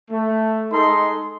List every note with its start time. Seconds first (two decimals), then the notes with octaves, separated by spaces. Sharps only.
0.10 A3
0.72 G#3 D#4 A4 C6